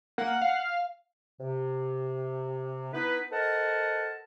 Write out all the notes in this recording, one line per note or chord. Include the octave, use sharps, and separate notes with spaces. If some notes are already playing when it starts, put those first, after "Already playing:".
A#3 F#5
F5
C3
B3 D#4 E4 B4
A4 A#4 C5 D#5 F#5 A5